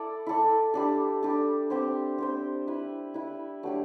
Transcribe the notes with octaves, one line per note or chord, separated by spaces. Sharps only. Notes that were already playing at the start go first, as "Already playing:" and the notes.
Already playing: E4 A4 D5
E4 A4 D5
G3 D4 A4
G3 D4 A4
C4 G4 C5
C4 G4 C5
E4 B4 E5
E4 B4 E5
F#3 A3 D4 G4